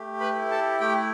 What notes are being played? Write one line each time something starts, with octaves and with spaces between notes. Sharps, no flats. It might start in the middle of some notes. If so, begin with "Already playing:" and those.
Already playing: A3 G4
B4 B5
E4
A4 A5
A3 G4 G5